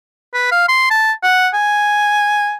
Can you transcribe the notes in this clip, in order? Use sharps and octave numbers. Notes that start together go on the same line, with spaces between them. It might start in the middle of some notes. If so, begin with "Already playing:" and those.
B4
F5
C6
A5
F#5
G#5